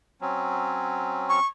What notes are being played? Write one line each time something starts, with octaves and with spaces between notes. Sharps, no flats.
F#3 C4 C#4
C#6